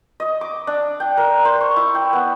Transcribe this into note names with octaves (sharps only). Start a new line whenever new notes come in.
D#5
D6
D4
G5
A#4
C5
C#6
E4
G5
B3